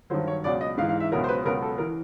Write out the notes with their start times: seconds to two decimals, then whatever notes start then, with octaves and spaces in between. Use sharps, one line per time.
0.10 G2 D#3 F#3 C5
0.27 C#5
0.44 C#2 B2 F#3 D5
0.61 D#5
0.77 G#2 F5
0.81 E3
0.89 F5
1.00 E5
1.11 C#2 B2 F#3 A#4
1.24 C5
1.29 B4
1.45 C#2 B2 F#3 A#4
1.62 A4
1.78 E3 A#4